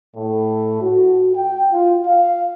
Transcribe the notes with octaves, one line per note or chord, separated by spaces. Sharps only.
A2
F#4
G5
F4
F5